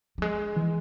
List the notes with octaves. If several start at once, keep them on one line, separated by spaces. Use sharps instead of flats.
F#3
G#3
E3